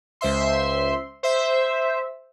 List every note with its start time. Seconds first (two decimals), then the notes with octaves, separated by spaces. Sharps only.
0.21 C#2 C5 E5 C6
1.23 C5 E5